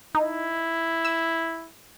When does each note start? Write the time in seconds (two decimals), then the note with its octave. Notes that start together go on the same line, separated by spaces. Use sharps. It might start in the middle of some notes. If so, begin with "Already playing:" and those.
0.15 D#4 E4
1.05 E6